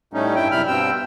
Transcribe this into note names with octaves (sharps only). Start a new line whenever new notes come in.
A2 G3 A3 C#4 D#4
G2 E4 G5
F#2 C3 G3 E4 B5 F6
G2 B2 C4 G5 E6